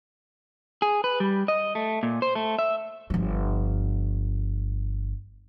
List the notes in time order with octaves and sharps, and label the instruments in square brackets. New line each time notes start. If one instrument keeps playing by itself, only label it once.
[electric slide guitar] G#4
B4
G3
D#5
A3
A#2
C5
A3
E5
[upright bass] G1 F3